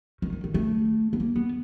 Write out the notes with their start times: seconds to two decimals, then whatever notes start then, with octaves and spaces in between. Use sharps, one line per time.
0.22 D#3
0.33 D#3
0.44 D#3
0.54 A3
1.13 B3
1.20 A#3
1.36 B3